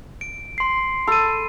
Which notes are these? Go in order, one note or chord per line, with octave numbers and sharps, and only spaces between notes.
D7
C6 C7
A4 B5 D#7